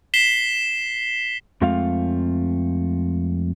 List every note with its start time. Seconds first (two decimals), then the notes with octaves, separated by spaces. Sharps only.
0.14 B6 C7 E7 G7
1.61 F2 G#3 A3 C4 F4 F5